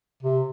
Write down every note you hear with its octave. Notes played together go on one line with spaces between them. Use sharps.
C3